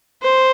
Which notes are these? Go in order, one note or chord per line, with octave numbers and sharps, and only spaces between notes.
C5